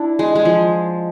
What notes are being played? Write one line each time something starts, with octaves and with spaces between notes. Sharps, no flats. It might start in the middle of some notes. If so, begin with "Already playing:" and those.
Already playing: D4 E4
G#3
G#3
F3